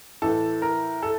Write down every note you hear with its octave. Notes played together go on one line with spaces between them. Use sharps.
A2 E3 A4 A5
A#4 A#5
A4 A5